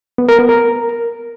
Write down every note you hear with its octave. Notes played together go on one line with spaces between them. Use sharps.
B3
A#4
B3
A#4